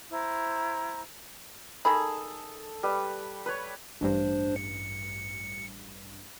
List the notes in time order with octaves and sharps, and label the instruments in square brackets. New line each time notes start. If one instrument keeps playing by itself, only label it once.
[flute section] E4 C5 A#5
[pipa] D#3 G#4 B5 [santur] A4
[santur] G3 B4
B4 C#5
[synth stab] A1 G2 [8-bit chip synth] D4 C5
[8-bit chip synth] C#7